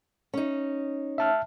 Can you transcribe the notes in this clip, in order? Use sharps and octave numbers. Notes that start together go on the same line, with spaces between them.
C#4 D#4
E5 A5 F6